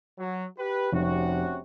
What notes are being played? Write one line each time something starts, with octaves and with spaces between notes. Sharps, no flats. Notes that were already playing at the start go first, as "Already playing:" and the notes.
F#3
G4 B4
F1 C3 C#4 F#4